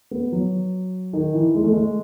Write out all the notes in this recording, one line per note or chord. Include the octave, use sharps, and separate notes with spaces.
B3
F#3
D#3
E3
G#3
A3
G#3